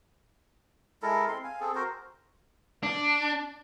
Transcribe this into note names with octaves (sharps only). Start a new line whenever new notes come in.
G#3 E4 A4 A#4
C4 C6
F5 G#5
C4 G#4 A4
F#4 A#4 C5
D4